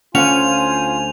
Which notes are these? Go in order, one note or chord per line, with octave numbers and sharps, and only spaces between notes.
D2 C#4 F4 C5 F#5 G#5 F7